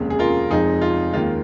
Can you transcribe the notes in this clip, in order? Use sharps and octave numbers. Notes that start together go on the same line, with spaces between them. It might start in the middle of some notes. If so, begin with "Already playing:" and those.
Already playing: F1 D#2 C#3 G#3
G#4
F4 A#4
F1 F2 F3 G#3 D#4 G#4
F4
D#2 D#3 G#3 F4